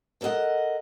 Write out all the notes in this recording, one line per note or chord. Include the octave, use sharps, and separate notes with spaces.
A4 A#4 D5 D#5 F#5